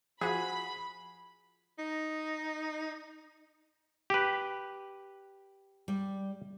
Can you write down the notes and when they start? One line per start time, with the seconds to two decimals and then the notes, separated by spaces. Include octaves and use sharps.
0.21 F3 F#4 G#4 B5
1.79 D#4
4.10 G4 B4
5.88 G3